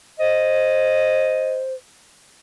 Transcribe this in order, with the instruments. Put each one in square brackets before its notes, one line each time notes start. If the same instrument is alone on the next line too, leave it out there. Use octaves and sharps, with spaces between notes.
[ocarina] C5 [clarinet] D#5